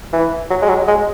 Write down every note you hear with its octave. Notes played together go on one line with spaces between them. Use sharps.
E3
F#3
G#3
F#3
G#3